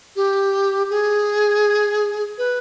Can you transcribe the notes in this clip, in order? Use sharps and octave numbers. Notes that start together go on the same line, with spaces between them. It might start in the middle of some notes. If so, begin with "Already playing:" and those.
G4
G#4
B4